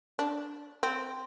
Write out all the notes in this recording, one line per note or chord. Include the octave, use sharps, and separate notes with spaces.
D4
C4